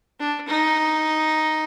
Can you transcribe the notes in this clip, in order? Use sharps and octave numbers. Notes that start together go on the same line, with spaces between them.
D4
D#4